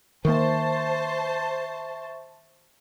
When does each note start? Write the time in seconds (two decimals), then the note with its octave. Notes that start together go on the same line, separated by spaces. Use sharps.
0.25 D#3 A#3 C5 E5 A5 C#6